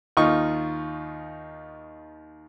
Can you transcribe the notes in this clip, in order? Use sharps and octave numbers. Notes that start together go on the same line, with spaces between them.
D#2 D#4 F4 C#6